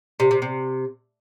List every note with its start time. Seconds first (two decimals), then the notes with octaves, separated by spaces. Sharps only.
0.20 C3
0.31 C3
0.42 C3